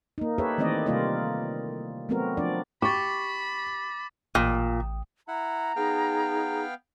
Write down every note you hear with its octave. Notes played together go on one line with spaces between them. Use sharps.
A#3 D#4
G4 A4 B4 C#5 E5
D#3 E3 A3 C4 D5 D#5
C3 G3 A#3 F4 D5 D#5
F#3 A3 B3 C4 F#4 A#4
F3 D4 D5
G4 B5 C#6 D6 A6
A1 A#2 G5 D#6
E4 F#5 A#5
B3 D#4 G#4 F5 G5